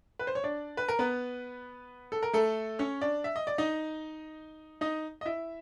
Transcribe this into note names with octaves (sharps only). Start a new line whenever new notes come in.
B4
C5
C#5
D4 D5
B4
A#4
B3 B4
A4
A#4
A3 A4
C#4 C#5
D4 D5
E5
D#5
D5
D#4 D#5
D#4 D#5
D#5
E4 E5